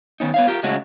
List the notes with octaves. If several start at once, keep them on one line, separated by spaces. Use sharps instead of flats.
D#3 B3 C#4 D#4
B3 C#5 F5
F4 G4 A#4
A2 C#3 G#3 A3 C#4 F#4